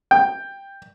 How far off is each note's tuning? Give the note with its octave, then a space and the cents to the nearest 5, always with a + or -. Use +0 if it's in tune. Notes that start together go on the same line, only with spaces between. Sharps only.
G5 +10